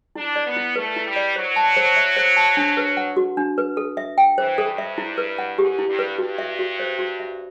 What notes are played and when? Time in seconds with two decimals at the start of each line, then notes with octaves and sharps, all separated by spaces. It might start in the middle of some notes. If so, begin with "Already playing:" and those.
0.16 D4 E4
0.36 D5
0.46 B3
0.56 E4
0.76 A3 B4
0.96 E4
1.06 G3
1.16 D5
1.36 F#3 C5
1.56 A5
1.77 C5
1.97 E5
2.17 C5
2.36 A5
2.57 D4
2.77 B4
2.97 F#5
3.17 F#4
3.37 D4
3.58 B4
3.77 A4
3.97 E5
4.18 G5
4.38 E3 C5
4.58 A4
4.68 G2
4.78 E5
4.98 E4
5.18 B4
5.38 F#5
5.58 F#2 G4
5.79 E4
5.88 G2
5.99 B4
6.18 G2 F#4
6.38 E5
6.59 F#4
6.80 C5
6.99 F#4
7.20 E5